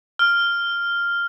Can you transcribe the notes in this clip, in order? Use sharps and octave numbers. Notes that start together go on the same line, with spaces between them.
F6